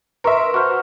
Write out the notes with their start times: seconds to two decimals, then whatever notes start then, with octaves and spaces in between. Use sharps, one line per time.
0.24 A#4 B4 E5 C6 C#6
0.54 F#4 C5 C#6 F6